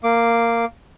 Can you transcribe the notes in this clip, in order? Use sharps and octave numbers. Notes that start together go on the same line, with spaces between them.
A#3 D6